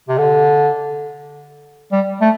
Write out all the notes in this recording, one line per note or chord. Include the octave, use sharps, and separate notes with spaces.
C3
D3
G3
A3